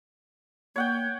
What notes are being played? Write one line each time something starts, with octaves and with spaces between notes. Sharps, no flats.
A#3 C#5 F#5 G5